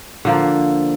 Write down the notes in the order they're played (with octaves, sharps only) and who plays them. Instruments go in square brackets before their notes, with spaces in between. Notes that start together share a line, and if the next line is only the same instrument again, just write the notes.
[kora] D3 F3 A#3